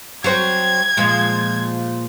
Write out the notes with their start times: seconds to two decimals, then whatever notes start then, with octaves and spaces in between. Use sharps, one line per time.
0.24 F#3 C4 G#6
0.97 A#2 F3 G#3